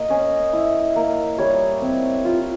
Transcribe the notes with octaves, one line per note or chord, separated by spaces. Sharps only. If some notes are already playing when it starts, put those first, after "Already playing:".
Already playing: A#3 D#5
C#4
E4
A#3
G3 C#5
C4
F4